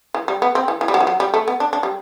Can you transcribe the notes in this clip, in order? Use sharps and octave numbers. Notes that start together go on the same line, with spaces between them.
E3
G3
B3
C4
E3
E3
G3
F#3
E3
F#3
G3
A3
B3
D4
D4
G3